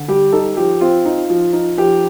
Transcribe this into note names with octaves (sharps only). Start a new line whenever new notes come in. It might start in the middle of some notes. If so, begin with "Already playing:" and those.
Already playing: D3
G3 G4
D#4 A4
F3 G4
C4 F4
D#4
F3
D#4
F3 G4